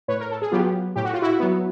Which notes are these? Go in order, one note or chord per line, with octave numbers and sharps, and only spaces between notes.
A2 B4 C#5
A#4
A4
G#4
F#3 B3 F4 G4
A2 G4
F#4
F4
E4 F#4
F#3 B3